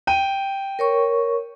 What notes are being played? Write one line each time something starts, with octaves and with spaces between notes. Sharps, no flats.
G5 D#7
A#4 C#5 C#6